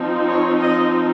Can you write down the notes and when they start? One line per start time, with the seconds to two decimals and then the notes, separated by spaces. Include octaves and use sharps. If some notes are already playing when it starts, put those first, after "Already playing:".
Already playing: F3 C4 D#4
0.28 C#5
0.62 D#5